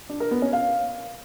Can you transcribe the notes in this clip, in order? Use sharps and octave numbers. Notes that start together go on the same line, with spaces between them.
D4
A#4
B3
C#4
F5